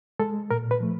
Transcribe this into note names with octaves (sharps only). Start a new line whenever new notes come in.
G#3 A4
A#2 A#4
B4
F3 A3